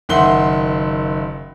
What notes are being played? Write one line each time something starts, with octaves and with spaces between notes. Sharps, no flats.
F#1 D#3 E5 F#5 C6 G7